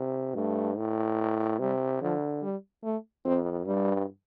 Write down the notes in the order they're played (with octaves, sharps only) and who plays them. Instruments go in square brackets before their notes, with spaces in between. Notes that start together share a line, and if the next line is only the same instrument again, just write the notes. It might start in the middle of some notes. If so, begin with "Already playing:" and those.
Already playing: [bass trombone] C3
[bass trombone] G2 [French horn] A3
[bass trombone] A2
[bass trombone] C3 [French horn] G3
[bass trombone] D3 [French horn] F3
[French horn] G3
A3
[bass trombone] F2 [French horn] C4
[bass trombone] G2 [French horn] G3